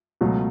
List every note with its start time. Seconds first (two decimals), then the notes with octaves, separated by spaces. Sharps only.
0.21 C#2 B2 F#3 A3